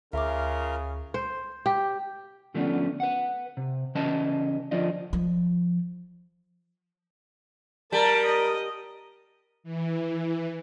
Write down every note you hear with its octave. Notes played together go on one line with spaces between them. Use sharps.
D2 C#3 F4 A#4 E5 D6
C5
G4
D3 F3 A3 B3 C#4 D4
B4 F#5
C3
C#3 E3 C#4 B4 D#5 A5
D3 F3 D4 F4 D5 D#5
F3
G3 A#4 A5 A#5
D#5
E3